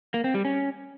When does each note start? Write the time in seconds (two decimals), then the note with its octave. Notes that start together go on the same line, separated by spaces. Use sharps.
0.14 A#3
0.24 C4
0.34 G3
0.45 C#4